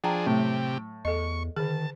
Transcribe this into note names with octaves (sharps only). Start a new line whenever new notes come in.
F3 D4 G#4 G5 A5 A#5
A2 C3 F#3 G4
E2 A4 D#5 C#6
D3 D#3 G#4 A5